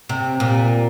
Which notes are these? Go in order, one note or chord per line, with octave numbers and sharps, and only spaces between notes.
C3
A#2